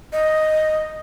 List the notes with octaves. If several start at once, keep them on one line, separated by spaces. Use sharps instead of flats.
D#5